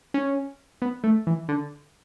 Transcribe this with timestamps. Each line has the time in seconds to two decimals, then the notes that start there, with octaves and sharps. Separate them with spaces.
0.14 C#4
0.82 B3
1.04 A3
1.27 E3
1.49 D3